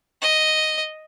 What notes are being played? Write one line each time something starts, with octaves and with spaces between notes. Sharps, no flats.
D#5